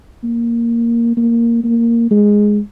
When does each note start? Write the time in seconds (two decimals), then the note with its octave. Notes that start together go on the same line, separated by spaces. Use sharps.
0.24 A#3
1.17 A#3
1.64 A#3
2.11 G#3